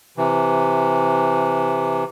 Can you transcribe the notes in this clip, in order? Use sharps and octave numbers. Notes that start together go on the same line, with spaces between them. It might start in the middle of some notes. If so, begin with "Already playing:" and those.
C3 E3